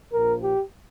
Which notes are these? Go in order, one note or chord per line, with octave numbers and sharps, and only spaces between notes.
A#1 A#2 F3 A#4
G4